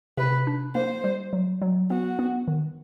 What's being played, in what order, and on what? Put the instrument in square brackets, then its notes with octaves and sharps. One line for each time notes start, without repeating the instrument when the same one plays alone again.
[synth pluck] C3 [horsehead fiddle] B4
[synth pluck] D4
[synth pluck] A#3 [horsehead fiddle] C5
[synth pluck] G3
F#3
F#3
[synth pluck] B3 [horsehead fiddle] F#4
[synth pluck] B3
D#3